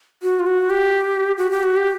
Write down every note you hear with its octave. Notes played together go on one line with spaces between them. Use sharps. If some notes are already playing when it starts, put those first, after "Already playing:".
F#4
F4
F#4
G4
F#4
G4
F#4
G4